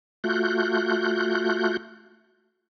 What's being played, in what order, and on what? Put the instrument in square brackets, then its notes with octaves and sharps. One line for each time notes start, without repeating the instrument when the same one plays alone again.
[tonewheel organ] A3 F4 F#4 F#6 G6